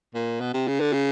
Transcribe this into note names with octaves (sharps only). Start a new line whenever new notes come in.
A#2
B2
C3
C#3
D3
C#3